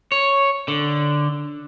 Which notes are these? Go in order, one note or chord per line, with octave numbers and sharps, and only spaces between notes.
C#5
D3